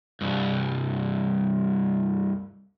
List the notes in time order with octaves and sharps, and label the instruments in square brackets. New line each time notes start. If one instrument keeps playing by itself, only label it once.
[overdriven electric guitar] C2 G2